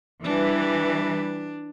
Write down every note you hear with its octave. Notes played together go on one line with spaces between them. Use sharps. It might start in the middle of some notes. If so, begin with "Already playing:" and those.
E3 G3 D4 B4